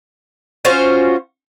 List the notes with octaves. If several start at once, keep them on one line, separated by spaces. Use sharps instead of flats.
C#4 F4 F#4 C5